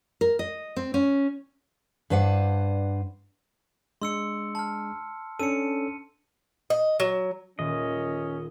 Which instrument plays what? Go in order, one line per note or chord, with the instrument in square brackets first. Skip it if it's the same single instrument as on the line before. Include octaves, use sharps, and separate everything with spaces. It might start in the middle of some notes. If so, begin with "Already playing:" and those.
[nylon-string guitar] A#4
D#5
C4
C#4
[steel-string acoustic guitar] G2 D4 B4 C5 F#5
[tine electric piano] G#3 D4 [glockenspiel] C6 E6 C#7
[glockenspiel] A5 F6
[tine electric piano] C#4 D4 A4 [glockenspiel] C#7 D#7
[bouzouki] D#5
F#3
[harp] D#1 [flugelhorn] C#4 [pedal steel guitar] D#5